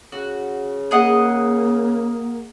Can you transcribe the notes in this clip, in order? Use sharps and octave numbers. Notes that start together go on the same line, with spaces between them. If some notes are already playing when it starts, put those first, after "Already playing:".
C#3 F#4
A#3 G#4 D#5 F#5